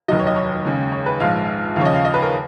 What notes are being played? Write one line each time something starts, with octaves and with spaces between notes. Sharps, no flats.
F1 D#2 D#3 F#3 D#5
C#5
D#5
C#5
D#2 C#3 G#3
C#5
B4
A#1 G#2 F3 F5
D#2 C#3 F3 C#5 F5
D#5
F5
D#5
B4
A#4